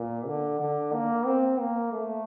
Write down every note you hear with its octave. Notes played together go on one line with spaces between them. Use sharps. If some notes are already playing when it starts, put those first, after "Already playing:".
Already playing: A#2
D3
D3
A#3
C4
A#3
A3